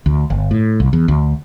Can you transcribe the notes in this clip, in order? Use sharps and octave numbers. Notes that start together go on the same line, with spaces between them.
D2
G1
A2
C2
E2
D2